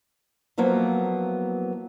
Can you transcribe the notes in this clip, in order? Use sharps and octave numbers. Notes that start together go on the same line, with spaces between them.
F3 F#3 A#3 B3 E4